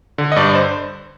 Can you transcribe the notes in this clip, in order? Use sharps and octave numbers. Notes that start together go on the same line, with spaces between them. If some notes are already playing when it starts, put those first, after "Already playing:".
D3
D#5
G2 D5
C5